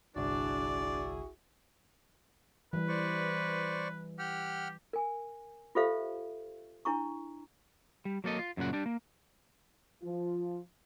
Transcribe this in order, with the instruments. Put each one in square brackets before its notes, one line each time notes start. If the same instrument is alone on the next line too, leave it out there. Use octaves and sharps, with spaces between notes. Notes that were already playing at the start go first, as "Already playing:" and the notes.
[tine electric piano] G1 C2 [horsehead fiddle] D4 [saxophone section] E4 F#4 G#4 [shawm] D5
[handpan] E3 G3 [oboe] B4
[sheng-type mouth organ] C5 D5 C#6
[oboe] G4 [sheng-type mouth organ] F#5 G5 F6
[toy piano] A#4 G#5
F4 G4 A4 C5 E5 F5
D4 E4 A#5 C#6
[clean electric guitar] G3
F#3 A#3 A4 D#5
F4
F#2 A#2 C#3 F#5
G3 D4
A#3
[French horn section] F3 F4